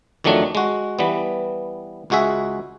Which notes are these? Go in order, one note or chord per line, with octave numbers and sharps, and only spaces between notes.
F2 D#3 F#3 A3 D4
G#3 F#4
E3 G3 B3
C#2 G#3 F#4 G#4 E5